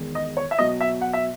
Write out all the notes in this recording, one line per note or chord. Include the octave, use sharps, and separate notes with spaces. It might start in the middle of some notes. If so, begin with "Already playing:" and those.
Already playing: E2 D#3 G#3
D#5
C#5
E5
B2 F#3 D#5
E5
F#5
E5